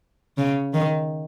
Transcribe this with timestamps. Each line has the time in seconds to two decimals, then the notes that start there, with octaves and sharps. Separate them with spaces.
0.38 C#3
0.74 D#3